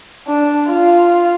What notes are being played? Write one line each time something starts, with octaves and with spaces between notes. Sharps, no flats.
D4
F4